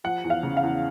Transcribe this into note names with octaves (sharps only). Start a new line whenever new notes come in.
F3 F#5
E2
F5
C#3
F5
E2